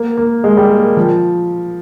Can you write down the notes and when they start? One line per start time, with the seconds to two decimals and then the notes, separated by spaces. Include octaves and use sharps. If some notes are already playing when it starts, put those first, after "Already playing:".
Already playing: A#3
0.17 A#3
0.44 G#3
0.57 G3
0.70 A#3
0.97 F3